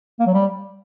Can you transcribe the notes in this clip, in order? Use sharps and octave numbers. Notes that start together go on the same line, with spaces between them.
A#3
F#3
G3